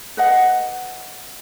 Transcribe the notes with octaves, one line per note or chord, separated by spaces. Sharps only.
B4 D#5 F#5